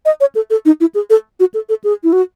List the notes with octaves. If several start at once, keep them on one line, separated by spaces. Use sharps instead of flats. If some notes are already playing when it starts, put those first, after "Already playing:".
D#5
C#5
A4
A4
D#4
E4
G#4
A4
F#4
A4
A4
G#4
E4
F#4